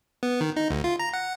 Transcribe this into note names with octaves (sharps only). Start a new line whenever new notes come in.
B3
D#3
D#4
D2
F4
A#5
F#5